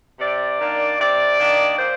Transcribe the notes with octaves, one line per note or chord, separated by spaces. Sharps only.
C3 D5
D#3 A#3 D4
C3 D5
D#3 A#3 D4
A#2 C5